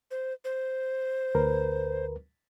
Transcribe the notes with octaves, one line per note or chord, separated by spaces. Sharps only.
C5
C5
D2 A#4 B4